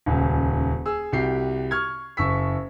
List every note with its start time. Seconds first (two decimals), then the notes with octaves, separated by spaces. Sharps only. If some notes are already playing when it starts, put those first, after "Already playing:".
0.06 D#1 C#2
0.85 G#4 E6
1.12 C2 F#4 G4 C7
1.71 C#6 F6 G#6
2.17 F#1 C#6 E6 B6